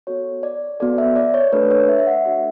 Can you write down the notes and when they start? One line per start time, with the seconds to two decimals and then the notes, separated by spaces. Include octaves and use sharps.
0.07 B3 F#4 A4 C#5
0.43 D5
0.80 B3 F#4 A4 D5
0.98 E5
1.16 D5
1.34 C#5
1.53 A3 D4 F#4 A4 B4
1.71 C#5
1.89 E5
1.99 E5
2.07 F#5
2.25 A3 D4 F#4 A4 E5